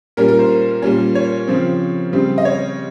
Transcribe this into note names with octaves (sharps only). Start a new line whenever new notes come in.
A#2 G3 C#4 A#4
A#4
C5
A#2 G3 C#4
C#5
C#3 F3 C4
C#3 G3 C4
D#5
C#5